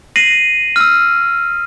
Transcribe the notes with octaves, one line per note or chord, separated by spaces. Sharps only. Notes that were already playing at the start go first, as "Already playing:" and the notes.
A#6 C7 D#7 F#7
E6 F6